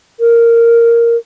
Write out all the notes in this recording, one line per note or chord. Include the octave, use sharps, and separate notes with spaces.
A#4